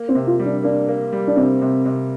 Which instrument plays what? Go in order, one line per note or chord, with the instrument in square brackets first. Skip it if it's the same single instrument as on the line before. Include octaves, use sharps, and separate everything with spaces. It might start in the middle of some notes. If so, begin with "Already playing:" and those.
Already playing: [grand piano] A#3
[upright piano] C4
[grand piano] C3
[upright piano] F4
[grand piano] G3
[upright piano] D4
[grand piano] A#3 [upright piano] D4
[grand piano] A#3
G3
[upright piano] D4
[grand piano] C3 [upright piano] C4
[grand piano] C3
C3